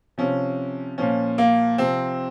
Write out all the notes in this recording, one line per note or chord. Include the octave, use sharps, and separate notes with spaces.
C3 F3 C#4
A#2 F3 C#4
A#3
C3 F3 C4